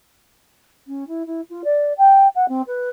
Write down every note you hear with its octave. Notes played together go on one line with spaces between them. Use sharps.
C#4
E4
E4
F4
D5
G5
F#5
C4
B4